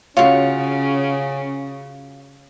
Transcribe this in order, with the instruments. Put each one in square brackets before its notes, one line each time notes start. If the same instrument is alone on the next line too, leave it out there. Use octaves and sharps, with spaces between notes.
[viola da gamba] C#3 [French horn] C#4 [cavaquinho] F4 F#4 [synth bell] C#5 F5 C#6